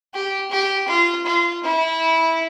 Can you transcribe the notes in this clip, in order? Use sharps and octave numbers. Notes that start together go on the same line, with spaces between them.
G4
G4
F4
F4
E4